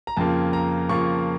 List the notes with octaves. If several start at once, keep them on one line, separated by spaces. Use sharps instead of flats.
A#5
F2 C#3 F3 A#3 A5
A#5
F2 C#3 F3 A#3 C#6